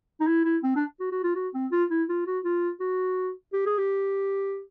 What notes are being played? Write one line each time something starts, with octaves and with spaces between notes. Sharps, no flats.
D#4
E4
E4
C4
D4
F#4
F#4
F4
F#4
C4
F4
E4
F4
F#4
F4
F#4
G4
G#4
G4